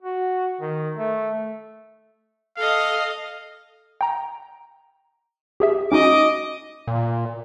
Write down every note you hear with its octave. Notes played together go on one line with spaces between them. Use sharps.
F#4
D#3
A3
A4 D#5 F5
G5 A#5
G4 G#4 E5
C#4 D#4 F#4 D#5 D6
A#2